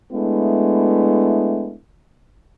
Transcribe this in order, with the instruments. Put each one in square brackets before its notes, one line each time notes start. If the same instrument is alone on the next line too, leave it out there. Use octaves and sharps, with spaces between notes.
[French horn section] G#3 A3 B3 D4 E4